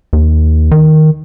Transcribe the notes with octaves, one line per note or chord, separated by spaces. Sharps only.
D#2
D#3